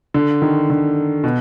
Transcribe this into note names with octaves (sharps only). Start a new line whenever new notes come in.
D3
D#3
D3
B2